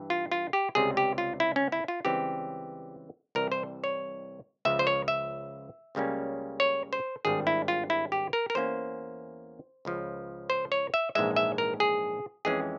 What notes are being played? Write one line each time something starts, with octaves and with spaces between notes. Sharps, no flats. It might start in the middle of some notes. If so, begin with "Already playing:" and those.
Already playing: G2 E3
F4
F4
G4
C#2 C3 G3 G#4
G4
F4
E4
C#4
E4
F4
C#2 C#3 E3 G3 C4 G4
C2 C3 E3 G3 A#4
C5
C#5
C#2 C#3 F3 E5
C5
C#5
E5
C#2 C#3 G3 A#3 C#4
C#5
C5
G#1 G2 G3 G#4
E4
F4
E4
G4
A#4
A#4
E2 E3 A#3 C#4 C5
C#2 C#3 F3
C5
C#5
E5
A#1 G#2 E3 G#3 E5
E5
A#4
G#4
F2 E3 G#3 C#4 G#4